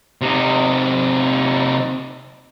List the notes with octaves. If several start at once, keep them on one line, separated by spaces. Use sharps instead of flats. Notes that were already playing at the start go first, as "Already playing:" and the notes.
C3 D#4